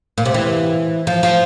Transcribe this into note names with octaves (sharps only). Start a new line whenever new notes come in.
A#2
C3
E3
F3
F3